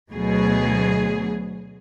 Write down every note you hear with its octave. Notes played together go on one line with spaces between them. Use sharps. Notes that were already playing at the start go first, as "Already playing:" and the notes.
D2 B2 F#3 G#4